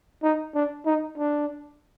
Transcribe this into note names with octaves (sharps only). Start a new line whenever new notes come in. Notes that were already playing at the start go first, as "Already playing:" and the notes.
D#4
D4
D#4
D4